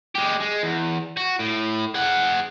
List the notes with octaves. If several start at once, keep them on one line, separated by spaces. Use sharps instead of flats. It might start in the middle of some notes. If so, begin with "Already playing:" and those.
G#3 G4
G#3
E2
F#4
A2
G#4 F#5